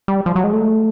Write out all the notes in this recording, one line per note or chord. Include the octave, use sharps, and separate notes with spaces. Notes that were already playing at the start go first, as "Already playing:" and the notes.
G3
F3
F#3
G#3
A3